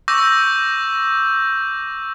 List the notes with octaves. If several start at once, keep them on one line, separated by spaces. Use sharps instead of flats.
C#6 D6 E6 G6 A#6